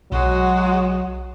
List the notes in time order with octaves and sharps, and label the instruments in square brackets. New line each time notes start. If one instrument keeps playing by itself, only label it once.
[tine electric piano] B1 [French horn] F#3 [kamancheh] G#3 F#4